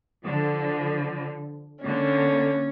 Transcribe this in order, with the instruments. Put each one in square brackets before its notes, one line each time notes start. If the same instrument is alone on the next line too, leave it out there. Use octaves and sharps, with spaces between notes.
[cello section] D3 F3
[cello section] D3 A#3 [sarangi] C#4